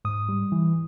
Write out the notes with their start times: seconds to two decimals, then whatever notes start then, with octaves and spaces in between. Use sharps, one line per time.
0.05 G#2 D#6
0.29 G3
0.52 E3